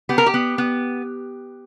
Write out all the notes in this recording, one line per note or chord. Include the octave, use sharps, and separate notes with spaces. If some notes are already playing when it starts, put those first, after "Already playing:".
B3 G4
A#4
G4
B3
B3